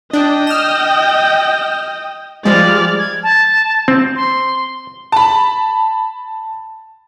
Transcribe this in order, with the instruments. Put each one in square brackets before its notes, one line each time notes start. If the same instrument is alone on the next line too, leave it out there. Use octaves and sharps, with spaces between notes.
[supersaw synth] D4 [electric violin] D#5 G5
[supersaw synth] F6 E7
[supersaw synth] F3 G3 G#3 [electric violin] D5 F6
[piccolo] G#6
A5
[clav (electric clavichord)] C4
[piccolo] C6
[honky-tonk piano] A5 B5